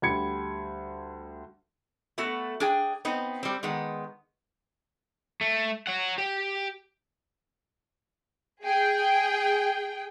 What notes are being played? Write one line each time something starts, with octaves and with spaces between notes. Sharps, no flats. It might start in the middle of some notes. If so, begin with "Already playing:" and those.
D2 G3 B5 G#6 C#7
A3 B3 F#4 A4
D4 G#4 G5
B3 C4 D#4
G3 C4
D#3 G#3 B3
A3
C#5 F#5
G4
G#4 G5